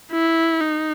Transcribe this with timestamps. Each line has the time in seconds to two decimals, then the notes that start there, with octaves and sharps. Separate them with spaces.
0.12 E4
0.61 D#4